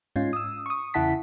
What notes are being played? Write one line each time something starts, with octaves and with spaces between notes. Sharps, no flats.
G#2 C#4 F4
D#6 E6
C#6 D#6
E2 C#3 E4 F#5 A5 B6